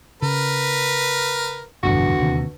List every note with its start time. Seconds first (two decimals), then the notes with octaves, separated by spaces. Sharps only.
0.22 C#3 A#4 B4
1.83 F1 A#1 E2 G2 D3 F#4
2.19 D#2 C3